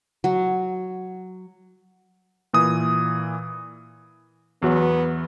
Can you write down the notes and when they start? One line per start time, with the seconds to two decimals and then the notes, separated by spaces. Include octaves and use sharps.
0.24 F#3
2.53 A#2 E3 D#6
4.62 E2 F#3 B3